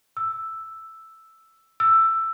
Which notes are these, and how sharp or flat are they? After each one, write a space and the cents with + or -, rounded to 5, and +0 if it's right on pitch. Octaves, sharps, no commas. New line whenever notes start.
E6 +0
E6 +10